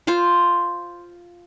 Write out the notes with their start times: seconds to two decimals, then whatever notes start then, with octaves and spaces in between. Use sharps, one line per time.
0.07 F4 C5 F5 C6